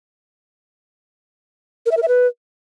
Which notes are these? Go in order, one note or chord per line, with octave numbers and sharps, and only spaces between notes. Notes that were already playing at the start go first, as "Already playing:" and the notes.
A#4
E5
A#4
E5
B4